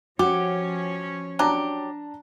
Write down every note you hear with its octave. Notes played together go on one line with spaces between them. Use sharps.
F3 C#4 F#4 G4 C#5
F#3 D4 G4 A5 A#5